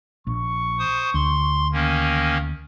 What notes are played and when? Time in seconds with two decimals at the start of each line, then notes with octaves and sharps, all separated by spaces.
0.27 A#1 C#6
0.79 C5 D#6
1.14 D2 C6
1.73 D#3 A#3 C#4